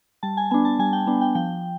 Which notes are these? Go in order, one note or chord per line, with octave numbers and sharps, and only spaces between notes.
G3 A5
G#5
B3 D4 G#5
A5
G3 G#5
G5
B3 D4
G5
F3 G5